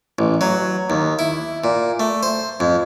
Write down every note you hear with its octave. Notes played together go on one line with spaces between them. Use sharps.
A1
F#3
D#2
E4
A#2
A3
C5
F2